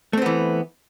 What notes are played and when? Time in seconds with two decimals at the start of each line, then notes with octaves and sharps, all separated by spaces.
0.13 A3
0.18 C4
0.22 B3
0.26 E3